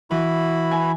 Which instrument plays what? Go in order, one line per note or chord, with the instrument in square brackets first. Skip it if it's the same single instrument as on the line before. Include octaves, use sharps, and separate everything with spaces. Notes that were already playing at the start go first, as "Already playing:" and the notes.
[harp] E3 [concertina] E4 F#4 B5
[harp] G#5